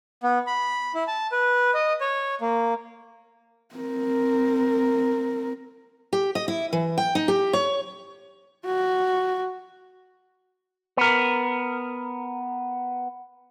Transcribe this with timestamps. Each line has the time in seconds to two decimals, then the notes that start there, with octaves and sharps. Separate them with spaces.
0.23 B3
0.47 B5
0.95 E4
1.07 A5
1.32 B4
1.74 D#5
2.01 C#5
2.41 A#3
3.75 C4 A#4
6.13 G4
6.35 D#5
6.48 E4
6.73 E3
6.98 G5
7.15 D#4
7.28 G4
7.53 C#5
8.65 F#4
10.97 B3 A#4